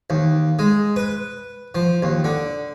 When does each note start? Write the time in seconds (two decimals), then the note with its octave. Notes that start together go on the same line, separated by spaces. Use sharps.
0.10 D#2
0.59 G#3
0.96 B4
1.75 F3
2.03 D#2
2.24 D3